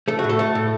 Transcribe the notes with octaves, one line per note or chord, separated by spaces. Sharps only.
A3 A4
F#4
A2
A4
A3
A2